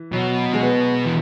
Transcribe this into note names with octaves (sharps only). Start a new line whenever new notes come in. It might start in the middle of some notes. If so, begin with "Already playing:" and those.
Already playing: E3
B2 F#3
G#3
B3
E3